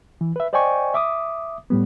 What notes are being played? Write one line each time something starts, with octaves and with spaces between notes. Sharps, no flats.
E3
B4 E5
C5 D5 D#5 G5 G#5 C#6
E5 D6 D#6
A2 G3 B3